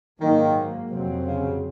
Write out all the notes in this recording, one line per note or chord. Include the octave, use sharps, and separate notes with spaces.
G#2 D#3 F#3 A#3
F2 C3 F#3 C4
C#3